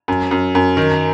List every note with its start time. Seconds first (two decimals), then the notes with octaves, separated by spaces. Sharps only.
0.08 F#2
0.31 F#2
0.55 F#2
0.77 D#3